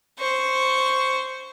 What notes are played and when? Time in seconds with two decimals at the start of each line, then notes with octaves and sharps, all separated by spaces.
0.19 C5 C#6